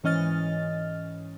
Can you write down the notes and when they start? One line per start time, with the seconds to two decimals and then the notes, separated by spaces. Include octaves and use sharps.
0.03 G#2 E3 C#4 D#5 F6 A6